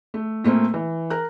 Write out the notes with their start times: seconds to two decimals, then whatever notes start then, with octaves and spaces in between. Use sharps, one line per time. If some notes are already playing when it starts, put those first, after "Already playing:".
0.14 A3
0.44 A#2 A3 A#3 C4
0.74 E3
1.10 A#4 F#6